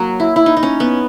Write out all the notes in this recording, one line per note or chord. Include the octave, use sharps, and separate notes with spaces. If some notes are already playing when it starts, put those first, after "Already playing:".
Already playing: F#3 A#3
E4
E4
D#4
D#4
C#4
B3